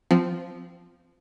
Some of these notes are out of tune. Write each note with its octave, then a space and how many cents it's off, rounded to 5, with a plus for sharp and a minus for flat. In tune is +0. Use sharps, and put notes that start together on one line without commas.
F3 +0 C4 -15